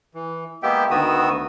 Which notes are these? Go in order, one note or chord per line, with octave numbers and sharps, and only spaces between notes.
E3
G#3 A#3 B3 G4 E5 G5
D2 D#3 B3 F#4 D#6 E6